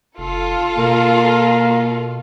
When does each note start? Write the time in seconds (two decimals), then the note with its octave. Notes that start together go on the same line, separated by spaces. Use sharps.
0.18 F1 F4 A4 F5
0.77 B2 A#3